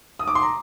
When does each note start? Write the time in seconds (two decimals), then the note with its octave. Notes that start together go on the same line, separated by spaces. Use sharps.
0.19 D#6
0.28 D6
0.35 C6
0.43 A#5